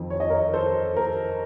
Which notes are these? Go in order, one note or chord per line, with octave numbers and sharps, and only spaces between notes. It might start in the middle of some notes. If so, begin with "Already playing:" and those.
Already playing: F2 D#3 C5
C#5
D#5
A#4 C#5
A4 C5
A#4